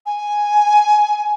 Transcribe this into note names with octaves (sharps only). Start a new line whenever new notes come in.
G#5